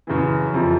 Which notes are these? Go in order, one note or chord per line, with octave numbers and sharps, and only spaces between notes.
F#2 C#3 E3
F2 C3 F3